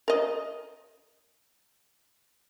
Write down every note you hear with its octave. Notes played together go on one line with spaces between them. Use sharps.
A#4 D#5